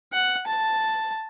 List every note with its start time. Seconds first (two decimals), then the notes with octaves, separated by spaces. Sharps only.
0.13 F#5
0.46 A5